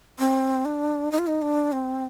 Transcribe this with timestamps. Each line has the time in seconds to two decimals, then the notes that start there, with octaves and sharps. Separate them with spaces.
0.19 C4
0.65 D4
1.12 D#4
1.19 F4
1.27 D#4
1.42 D4
1.72 C4